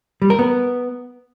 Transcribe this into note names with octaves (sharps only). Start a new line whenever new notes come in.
G3
A#4
B3